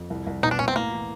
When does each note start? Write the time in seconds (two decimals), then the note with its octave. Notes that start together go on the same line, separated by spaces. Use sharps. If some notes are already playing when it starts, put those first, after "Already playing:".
Already playing: F2
0.10 C2
0.27 C2
0.43 B2 D#4
0.51 D4
0.59 B2 C#4
0.68 C4
0.75 A2 A#3
0.92 E3